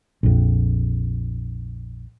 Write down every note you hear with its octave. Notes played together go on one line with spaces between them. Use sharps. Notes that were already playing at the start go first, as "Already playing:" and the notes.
A#1 F2